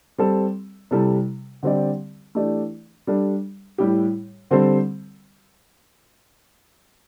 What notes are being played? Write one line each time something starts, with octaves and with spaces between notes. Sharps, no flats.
G3 C4 A4
C3 G3 E4 A4
D3 G3 C4 G4 D5
E3 A3 D4 G4 D5
G3 D4 A4
A2 G3 E4 G4
D3 G3 C4 A4 C5